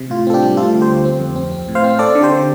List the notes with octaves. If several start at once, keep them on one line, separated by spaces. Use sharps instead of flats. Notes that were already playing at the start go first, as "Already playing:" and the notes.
Already playing: C3
A2 F4
C4 A4
D4 G4
G3
A3 F4 A4
D3
G4 C5
D2
C4
F2
C4
C4
A2
C5 F5
C4
C4 A4 D5
D3
G4 C5
D3